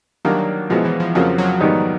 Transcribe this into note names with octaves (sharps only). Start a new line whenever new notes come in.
D#3 F#3 G3 A#3 D4
B2 F3 G#3 B3 E4
E3
F3
F2 C#3 F3 F#3 A#3
F#3
G#2 D#3 G3 B3 D#4